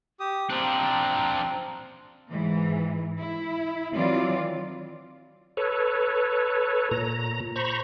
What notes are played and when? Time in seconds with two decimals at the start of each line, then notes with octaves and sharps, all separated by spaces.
0.20 G4 D#6
0.50 F3 C4 D4 A#5
2.30 G#2 E3
3.18 E4
3.92 D#3 E3 F#3 C4 F4 D5
5.57 A4 B4 C#5
6.91 A#2 A#5
7.56 C5 A#5 B5 C#6